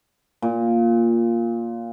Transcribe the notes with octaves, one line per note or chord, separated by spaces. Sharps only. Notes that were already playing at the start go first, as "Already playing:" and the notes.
A#2